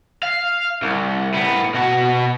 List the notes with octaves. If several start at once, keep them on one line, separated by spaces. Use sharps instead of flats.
F5
C2
A2 B3
B2 F#4